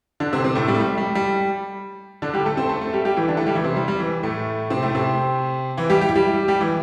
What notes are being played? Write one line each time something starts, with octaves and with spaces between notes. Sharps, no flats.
D3 D4
C3 C4
C3 C4
A2 A3
G3
A3
G3
G3
G3
D3 D4
G3 G4
A3 A4
C4 C5
A3 A4
A3 A4
G3 G4
G3 G4
E3 E4
D3 D4
A3 A4
G3 G4
E3 E4
C3 C4
G3
G3
E3
A2 A3
C3 C4
A2 A3
C3 C4
E3 E4
G3 G4
G4
E4
G3 G4
G3 G4
E3 E4